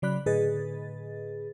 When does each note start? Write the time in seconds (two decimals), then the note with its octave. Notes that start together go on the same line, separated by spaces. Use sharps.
0.02 C#3 F#3 D5 B5 F#6
0.26 A2 D3 G#4 B4 D#5 A6